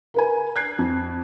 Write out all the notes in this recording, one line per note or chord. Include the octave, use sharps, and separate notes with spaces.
A#4 B4 G#5
F#6 G#6 C7
F2